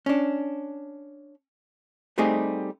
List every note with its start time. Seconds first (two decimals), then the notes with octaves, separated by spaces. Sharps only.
0.06 C#4 D4
2.18 G3 A3 C4 D#4 G4 G#4